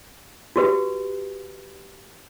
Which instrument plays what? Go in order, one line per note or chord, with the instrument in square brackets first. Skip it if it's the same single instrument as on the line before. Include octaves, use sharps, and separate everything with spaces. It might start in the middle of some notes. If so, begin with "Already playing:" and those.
[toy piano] F#4 G4 B4